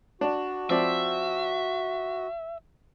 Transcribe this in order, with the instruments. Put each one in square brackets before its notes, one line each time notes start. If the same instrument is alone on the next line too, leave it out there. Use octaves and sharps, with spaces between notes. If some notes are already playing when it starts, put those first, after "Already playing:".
[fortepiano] D4 [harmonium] F#4
[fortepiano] F3 C4 D5 [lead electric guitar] E5